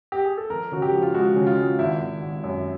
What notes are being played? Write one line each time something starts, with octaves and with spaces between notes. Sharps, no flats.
G4
G#4
A4
F2 A#4
C#3 F#4
G4
F3
F4
G#3 F#4
C#3
F4
G#3
G#1 E4
G#1
G#1
F#2